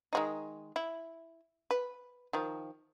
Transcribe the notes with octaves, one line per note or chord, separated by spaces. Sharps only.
D#3 G#3 D#4
E4
B4
D#3 F3